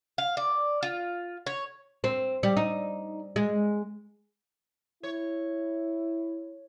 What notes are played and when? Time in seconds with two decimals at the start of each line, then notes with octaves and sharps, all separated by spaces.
0.18 F5
0.37 D5
0.83 F4
1.46 C#5
2.04 C4
2.43 G3
2.57 D#4
3.36 G#3
5.03 E4 C#5